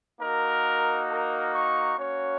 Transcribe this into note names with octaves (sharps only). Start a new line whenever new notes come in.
A#3 D#4 F#4 A#4
A#4
C#6
A#3 C#4 F#4 C#5